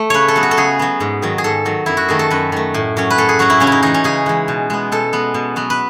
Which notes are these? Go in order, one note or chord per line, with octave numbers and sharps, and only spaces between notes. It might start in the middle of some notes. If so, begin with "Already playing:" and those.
Already playing: A3
C#3 B4 C#5
A4
F#3 B3
F#4
A4
C#3 G#4
F#3 B3
G#2
D#3 F#3
G#4
G#2 A4
D#3 F#3
F#2 E4
F#4
D#3 A3 G#4
A4
F#2 B4
D#3 A3
A2
F#3 C#4
B4
A2 A4
G#4
F#3 C#4 F#4
E4
C#3 C#4
D#4 E4
E3 G#3 D#4
C#4
C#3 G#4
E3 G#3
B2
G#3 B3
B2 A4
G#3 B3
B2
F#3 B3
B4